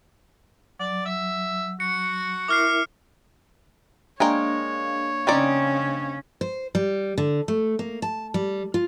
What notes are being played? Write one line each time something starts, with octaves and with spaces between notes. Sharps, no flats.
F#3 D5
E5
F#4 C#7
E4 A#4 E5 D6 F6 C7
G#3 A#3 D4 A#4 C#5 F5 G5
C#3 C4 C#4 D#4 D5
C5
G3
D3
A3
A#3
A5
G3
F4